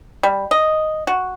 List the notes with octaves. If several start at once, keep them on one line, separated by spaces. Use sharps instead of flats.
G3
D#5
F#4